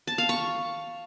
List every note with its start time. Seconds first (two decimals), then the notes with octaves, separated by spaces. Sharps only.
0.07 A5
0.18 F5
0.29 C#6